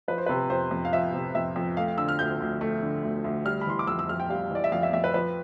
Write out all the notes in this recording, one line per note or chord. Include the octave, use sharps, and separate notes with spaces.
F3 B4
C5
B4
C3
F2 C5
F2
F5
F3 E5
C3
F2 E5
F2
A3 F5
F5
D3 E6
F6
D2 G6
D2
A3
D3
D2
D2
G3 F6
B5
E3 C6
D6
F2 E6
E6
F2 F6
G5
G3 F5
E3 D5
E5
F2 F5
E5
F2 E5
B4
F3 B4